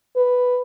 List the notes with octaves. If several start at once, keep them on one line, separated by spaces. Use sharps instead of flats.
B4